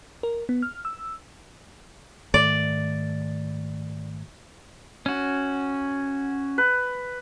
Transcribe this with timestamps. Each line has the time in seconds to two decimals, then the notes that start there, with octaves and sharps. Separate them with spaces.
0.23 A#4
0.49 B3
0.63 F6
0.85 E6
2.34 G#2 D#3 A3 D5
5.06 C#4 F#4
6.58 B4